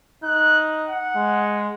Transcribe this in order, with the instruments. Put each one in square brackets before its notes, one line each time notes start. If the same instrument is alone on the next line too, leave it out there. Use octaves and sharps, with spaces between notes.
[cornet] D#4 [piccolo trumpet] F#6
[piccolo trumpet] F#5
[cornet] G#3